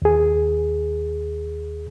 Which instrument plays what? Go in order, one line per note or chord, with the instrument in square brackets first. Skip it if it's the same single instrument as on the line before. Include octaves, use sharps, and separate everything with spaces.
[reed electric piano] D#2 G#4